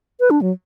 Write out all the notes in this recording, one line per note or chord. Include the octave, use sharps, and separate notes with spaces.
B4
D4
F#3